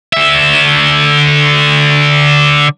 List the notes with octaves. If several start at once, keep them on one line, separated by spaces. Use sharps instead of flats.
D3 E5